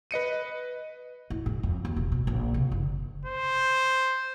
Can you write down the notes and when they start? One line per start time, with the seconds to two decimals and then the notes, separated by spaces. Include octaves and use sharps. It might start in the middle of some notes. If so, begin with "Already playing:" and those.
0.11 B4 D#5 C#7 D#7
1.30 E4
1.46 G#2
1.63 F2
1.85 D#2
1.96 E1
2.12 B2
2.27 A#1
2.54 C3
2.72 F#1
3.25 C5